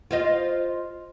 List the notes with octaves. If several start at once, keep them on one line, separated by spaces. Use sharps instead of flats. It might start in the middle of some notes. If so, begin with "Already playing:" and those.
F4 C5 D#5